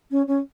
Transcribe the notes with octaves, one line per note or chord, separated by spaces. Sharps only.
C#4
C#4